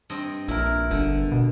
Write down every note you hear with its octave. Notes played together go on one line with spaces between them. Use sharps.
G2 C4 D#5
A#1 E4 A#4
G1 D3
B2